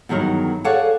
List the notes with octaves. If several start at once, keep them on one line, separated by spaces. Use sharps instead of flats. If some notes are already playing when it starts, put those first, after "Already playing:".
E2 G2 D#3 F#3 A#4
G#4 A4 C#5 D5 F5 F#5